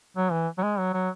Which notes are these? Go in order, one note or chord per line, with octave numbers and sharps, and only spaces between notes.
F#3
E3
F#3
G#3
F#3
F#3